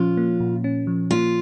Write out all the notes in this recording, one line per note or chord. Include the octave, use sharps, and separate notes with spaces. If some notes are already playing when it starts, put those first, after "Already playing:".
Already playing: A#2 F3 C#4 F4
A#3
A#2
C#4
F3
A#3 F4